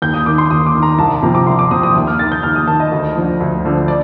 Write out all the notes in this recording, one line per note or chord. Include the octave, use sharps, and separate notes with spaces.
D#2 G6
D#6
D#3 D6
C6
D#2 D#6
D6
D#3
A#5
C2 A5
C3 F3 A#5
D6
C2 C6
D6
C3 F3 D#6
D#6
D#2 D#6
F6
D#3 A6
G6
D#2 F6
D#6
D#3 A5
D#5
D2
D3 F3
D2
D3 F3
D5